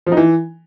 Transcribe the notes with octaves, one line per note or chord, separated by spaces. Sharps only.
F3
D#4
E3